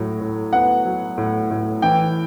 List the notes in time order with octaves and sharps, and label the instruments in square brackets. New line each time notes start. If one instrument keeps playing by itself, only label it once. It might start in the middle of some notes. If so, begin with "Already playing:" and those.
Already playing: [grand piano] A2 F#3
A2
B3 F#5
F#3
A2
A2
E3 G5